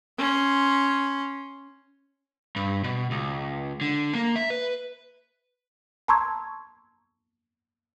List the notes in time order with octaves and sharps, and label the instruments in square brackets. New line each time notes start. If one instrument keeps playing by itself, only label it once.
[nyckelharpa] C#4 C6
[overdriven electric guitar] G2
B2
C#2
D3
A#3
E5
B4
[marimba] A5 A#5 C6 C#6 E6 G#6